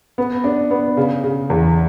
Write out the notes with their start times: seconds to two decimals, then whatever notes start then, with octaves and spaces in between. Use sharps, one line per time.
0.18 B3
0.44 D4
0.71 B3
0.97 C#3
1.24 C#3
1.50 E2